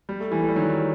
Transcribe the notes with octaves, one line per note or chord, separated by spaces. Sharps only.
G3
A3
E3 G3
A3
G3
D#3 F#3